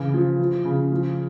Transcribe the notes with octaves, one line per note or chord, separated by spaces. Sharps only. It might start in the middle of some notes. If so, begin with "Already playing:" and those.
Already playing: C#3 E3
F3
F3
C#3
F3